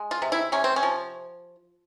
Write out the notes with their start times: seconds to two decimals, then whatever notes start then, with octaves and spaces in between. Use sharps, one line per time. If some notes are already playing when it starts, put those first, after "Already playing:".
Already playing: G#3
0.11 F4
0.22 C3
0.32 E4
0.52 C3 C#4
0.64 C4
0.76 C#4
0.83 F3